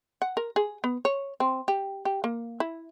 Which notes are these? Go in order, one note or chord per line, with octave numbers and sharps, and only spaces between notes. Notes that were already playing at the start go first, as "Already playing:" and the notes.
F#5
A#4
G#4
B3
C#5
C4
G4
G4
A#3
E4